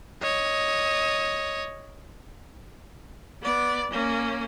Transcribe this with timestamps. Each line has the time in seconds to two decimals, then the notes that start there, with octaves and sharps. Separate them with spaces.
0.22 C#5 D#5
3.42 B3 D5
3.91 A#3 C#4